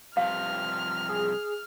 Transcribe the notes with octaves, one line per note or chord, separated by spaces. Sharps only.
G2 C3 F3 F5 F6
G#4